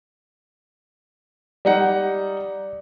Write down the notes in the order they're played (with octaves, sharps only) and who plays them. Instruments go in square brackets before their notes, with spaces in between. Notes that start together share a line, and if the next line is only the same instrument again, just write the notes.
[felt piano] G3 D#4 F#5 [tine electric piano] D5